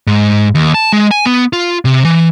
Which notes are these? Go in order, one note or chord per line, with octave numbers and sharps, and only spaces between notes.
G#2
D#2
A5
G#3
G#5
B3
F4
C3
E3